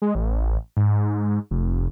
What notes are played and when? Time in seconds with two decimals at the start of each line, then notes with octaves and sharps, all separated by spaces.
0.02 G#3
0.15 A1
0.77 G#2
1.51 F1